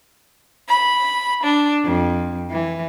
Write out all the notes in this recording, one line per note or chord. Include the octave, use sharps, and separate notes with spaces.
B5
D4
F2
E3